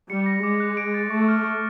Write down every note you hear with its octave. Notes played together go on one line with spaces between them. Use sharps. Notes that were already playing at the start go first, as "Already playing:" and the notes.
G3 C#7
A#6
G#3 D6
F#6
D7
A6
A3 C#6
F6
D7